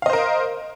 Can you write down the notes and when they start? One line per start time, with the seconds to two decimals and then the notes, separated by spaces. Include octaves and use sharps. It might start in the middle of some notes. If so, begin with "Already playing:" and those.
0.02 F5
0.06 D#5
0.10 C5
0.13 A#4